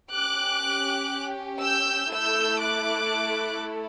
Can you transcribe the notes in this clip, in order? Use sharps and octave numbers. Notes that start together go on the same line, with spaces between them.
C#4 G4 D6 F#6
E6 G6
A3 E4 A4 E6 G6
D6 F#6